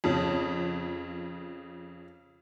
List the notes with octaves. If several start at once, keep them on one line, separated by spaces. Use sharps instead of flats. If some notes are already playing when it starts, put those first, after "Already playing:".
F2 C#3